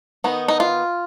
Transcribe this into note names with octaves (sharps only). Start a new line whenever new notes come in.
D#3 B3 D#4
D#4
F4